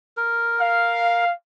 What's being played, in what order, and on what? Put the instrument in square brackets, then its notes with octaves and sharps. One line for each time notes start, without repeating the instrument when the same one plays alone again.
[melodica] A#4
[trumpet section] F5